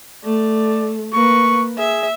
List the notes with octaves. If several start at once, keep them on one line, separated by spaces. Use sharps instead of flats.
A3 D5
A#3 B4 C#6
G#4 E5